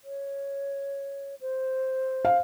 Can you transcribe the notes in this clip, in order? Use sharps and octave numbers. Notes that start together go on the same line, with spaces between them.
C#5
C5
F5